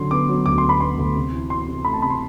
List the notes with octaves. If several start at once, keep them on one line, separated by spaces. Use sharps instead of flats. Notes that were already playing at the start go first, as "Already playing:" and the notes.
Already playing: D3 F#3 C6
B3 D6
F#3
D2 D6
B3 C6
B5
B3 C6
D2
C3
E3
E3 C6
C3
A3 B5
A5
C3 B5
C6